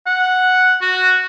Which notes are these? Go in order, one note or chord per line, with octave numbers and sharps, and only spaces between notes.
F#5
F#4